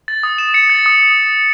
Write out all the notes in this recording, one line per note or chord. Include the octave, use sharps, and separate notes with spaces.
A6
D#6
E7
C#7
A6
D#6